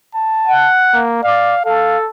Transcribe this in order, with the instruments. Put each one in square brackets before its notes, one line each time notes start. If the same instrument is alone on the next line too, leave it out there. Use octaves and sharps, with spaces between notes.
[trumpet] A5
[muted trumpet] F#5
[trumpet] A#3
[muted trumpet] D5 [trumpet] F5
[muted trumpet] A4 [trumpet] F5